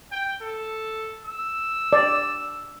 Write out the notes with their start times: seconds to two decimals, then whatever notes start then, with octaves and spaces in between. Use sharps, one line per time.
0.12 G5
0.43 A4
1.26 E6
1.93 D5